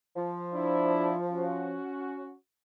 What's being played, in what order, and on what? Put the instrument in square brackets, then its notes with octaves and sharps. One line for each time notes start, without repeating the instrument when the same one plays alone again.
[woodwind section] F3
[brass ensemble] D4 E4
C#4 F#4